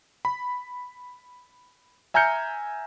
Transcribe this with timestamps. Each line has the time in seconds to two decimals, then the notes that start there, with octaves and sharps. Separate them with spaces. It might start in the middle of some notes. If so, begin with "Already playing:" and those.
0.25 B5
2.14 E5 G#5 A#5 F6 G6 C#7